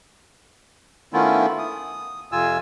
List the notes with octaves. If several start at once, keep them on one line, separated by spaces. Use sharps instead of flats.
D#3 A3 B3 C#4 E4 F4
D#6
F2 C3 F4 G#5 E6